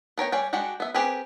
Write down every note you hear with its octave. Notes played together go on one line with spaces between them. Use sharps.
B3 A#4 C#5 G5
G3 G#4 C#5 G5
G#3 D4 F#4 G4 F#5
B3 E5
C4 G4 G#4 A#4 B4